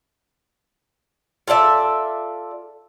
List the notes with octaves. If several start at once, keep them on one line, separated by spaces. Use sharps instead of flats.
F4 A4 D5 E5